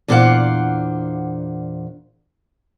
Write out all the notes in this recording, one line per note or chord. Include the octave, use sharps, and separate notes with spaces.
E2 A#2 D4 C5 F5 F#5